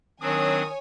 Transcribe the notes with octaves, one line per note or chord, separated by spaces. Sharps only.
D#3 F#3 C4 D4 C#5 G#5 D#6